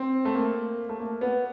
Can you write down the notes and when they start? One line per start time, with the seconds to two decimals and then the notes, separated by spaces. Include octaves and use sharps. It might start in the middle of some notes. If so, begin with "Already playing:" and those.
Already playing: C4
0.25 A3
0.34 A#3
0.89 A3
0.99 A#3
1.21 B3